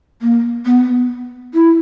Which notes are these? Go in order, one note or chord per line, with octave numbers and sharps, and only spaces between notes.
A#3
B3
E4